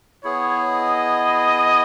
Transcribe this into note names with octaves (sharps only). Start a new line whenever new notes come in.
B3 E4 G#4 C#5
D#5